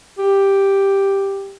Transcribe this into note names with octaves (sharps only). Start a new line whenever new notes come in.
G4